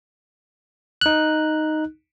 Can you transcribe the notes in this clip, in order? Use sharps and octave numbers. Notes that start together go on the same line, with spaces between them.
D#4 F#6